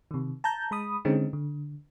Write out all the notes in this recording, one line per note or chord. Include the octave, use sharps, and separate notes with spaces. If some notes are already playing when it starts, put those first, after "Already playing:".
C3 D#3
A5 A#5 G6
G#3 B5 D#6
D3 G#3 C4 C#4 D#4
D3